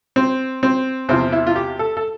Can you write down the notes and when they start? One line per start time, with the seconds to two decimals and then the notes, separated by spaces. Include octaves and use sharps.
0.16 C4
0.63 C4
1.09 E2 C3 F3 C4
1.32 E4
1.47 F4
1.56 G4
1.79 A4
1.97 A4